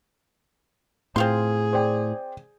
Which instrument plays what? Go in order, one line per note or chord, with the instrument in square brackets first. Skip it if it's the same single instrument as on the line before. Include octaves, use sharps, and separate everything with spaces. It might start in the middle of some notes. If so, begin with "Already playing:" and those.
[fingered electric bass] A2 [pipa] C4 F4 C6 [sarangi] G#4
[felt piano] C5 D5 G5